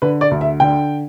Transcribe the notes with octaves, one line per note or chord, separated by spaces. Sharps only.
D3 B4
D5
D2
E5
D3 G5